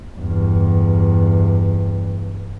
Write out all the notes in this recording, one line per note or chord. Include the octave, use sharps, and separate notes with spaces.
E2 G2